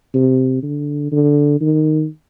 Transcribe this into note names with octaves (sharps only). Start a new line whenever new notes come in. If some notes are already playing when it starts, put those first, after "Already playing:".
C3
D3
D3
D#3